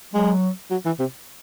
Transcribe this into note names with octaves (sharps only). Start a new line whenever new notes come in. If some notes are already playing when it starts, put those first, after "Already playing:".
F#3 G#3
F#3
E3
C3